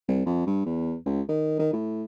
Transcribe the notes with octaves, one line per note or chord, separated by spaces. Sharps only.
C2
F2
G2
E2
C#2
D#3
D#3
A2